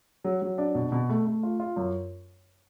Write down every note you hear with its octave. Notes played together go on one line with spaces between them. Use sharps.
F#3
F#3
D4
B2
B2
A3
A3
F4
F4
F#2